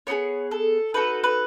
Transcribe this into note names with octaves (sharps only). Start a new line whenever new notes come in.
B3 D#4 G#4 C#5
A4
D#4 F#4 A4 B4
B4